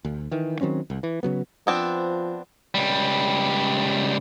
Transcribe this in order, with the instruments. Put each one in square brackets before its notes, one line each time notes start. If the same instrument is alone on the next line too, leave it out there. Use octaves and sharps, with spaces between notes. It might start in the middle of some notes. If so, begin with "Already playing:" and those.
[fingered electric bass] D2
D#3 E3
D#3 F#3 C4 C#4
C2
E3
C#3 F#3 B3
[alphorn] F3 [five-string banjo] B3 C4 D4
[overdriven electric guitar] C#2 G3